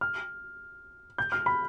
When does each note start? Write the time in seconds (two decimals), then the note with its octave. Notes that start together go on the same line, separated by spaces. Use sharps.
0.01 F6
1.18 G6
1.32 F6
1.46 B5